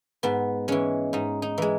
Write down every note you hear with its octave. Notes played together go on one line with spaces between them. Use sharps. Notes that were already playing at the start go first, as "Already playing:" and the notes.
G#2 B3
E3 G#3 C#4
G#2 D#4
D#4
E3 G#3